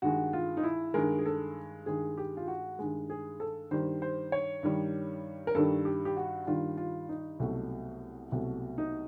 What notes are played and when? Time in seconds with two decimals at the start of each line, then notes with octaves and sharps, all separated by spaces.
0.02 G2 D#3 G#3 F#4
0.33 F4
0.57 D#4
0.63 E4
0.94 G2 D#3 G#3 A#4
1.18 G#4
1.26 A4
1.86 G2 D#3 G#3 G#4
2.18 G4
2.37 F4
2.48 F#4
2.79 G2 D#3 G#3
3.10 G#4
3.40 A4
3.71 G2 D#3 G3 C5
4.02 C5
4.32 C#5
4.63 G2 D#3 G3
5.47 A#4
5.55 G2 D#3 G3 A4
5.85 G4
6.05 G4
6.17 F#4
6.47 G2 D#3 G3 F4
6.77 F4
7.09 D#4
7.40 C2 B2 F#3 A3
8.32 C2 B2 F#3 A3
8.78 D#4